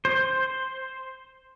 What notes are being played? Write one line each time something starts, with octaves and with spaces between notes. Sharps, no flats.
C5